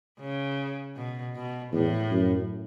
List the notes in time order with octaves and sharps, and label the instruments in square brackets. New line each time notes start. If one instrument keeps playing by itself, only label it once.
[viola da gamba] C#3
B2
B2
[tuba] E2 [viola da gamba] A2
[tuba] F#2